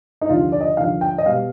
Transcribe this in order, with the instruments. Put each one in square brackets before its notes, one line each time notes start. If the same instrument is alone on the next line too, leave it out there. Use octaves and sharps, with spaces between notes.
[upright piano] D#4
D#2 D3 F3 F4
D5
D#5
D#2 D3 F3 F5
G5
D#5
B2 G3 F5